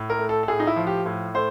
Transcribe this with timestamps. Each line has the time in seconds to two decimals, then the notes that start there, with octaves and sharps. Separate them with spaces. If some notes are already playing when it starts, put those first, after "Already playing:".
Already playing: A2
0.10 A#4
0.19 A3
0.29 A4
0.43 A4
0.48 A2 G#4
0.60 D#4
0.67 E4
0.76 F3
0.87 G4
1.06 A2
1.34 A3 C5